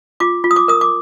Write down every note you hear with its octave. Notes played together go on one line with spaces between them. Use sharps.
F4 D6
F4
D#6
D6
A#4 D#6
D6